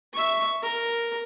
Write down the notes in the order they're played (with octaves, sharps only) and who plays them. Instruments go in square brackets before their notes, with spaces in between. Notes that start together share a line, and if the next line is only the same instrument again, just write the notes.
[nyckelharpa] E5 C#6
A#4